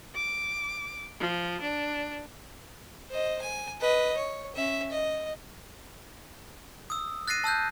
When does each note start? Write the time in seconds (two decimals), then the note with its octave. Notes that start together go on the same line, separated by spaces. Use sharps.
0.15 D6
1.20 F3
1.61 D4
3.10 C5 D#5
3.41 G#5
3.81 B4 D#5
4.17 C#5
4.55 C#4 E5
4.91 D#5
6.90 D#6 E6
7.28 F#6 A6 A#6 C7 D#7
7.44 A5 E6 F#6 G6